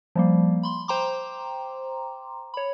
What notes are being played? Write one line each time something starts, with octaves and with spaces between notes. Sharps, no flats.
F3 G3 A#3
B5 C6
C5 G5 A#5 C6 D6
C#5 B5